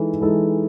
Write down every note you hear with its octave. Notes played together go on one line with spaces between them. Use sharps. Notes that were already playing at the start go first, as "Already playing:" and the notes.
Already playing: E3 G#3 D#4 A4
E3 G#3 D#4 A4